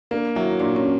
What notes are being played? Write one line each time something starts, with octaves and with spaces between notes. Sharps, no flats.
A#3 D4 D5
F#3 E4 E5
A#2 D4 D5
C#4 C#5